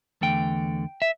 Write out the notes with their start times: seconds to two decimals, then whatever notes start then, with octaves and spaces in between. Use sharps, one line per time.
0.21 E2 D3 A3 G5
1.02 E5